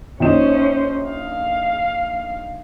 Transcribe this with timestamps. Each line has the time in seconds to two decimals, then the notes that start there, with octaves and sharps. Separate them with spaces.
0.20 A#1 C#4 D#4 C5 E7
1.09 F5